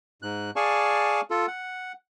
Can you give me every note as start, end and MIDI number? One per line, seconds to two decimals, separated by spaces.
0.22 0.51 44
0.22 0.51 90
0.56 1.21 68
0.56 1.21 74
0.56 1.21 77
0.56 1.21 80
0.56 1.21 81
0.56 1.21 85
1.30 1.46 65
1.30 1.46 69
1.48 1.92 78